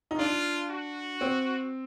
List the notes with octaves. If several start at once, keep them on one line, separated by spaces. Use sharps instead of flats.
D#4
D4 F4
F#4
C4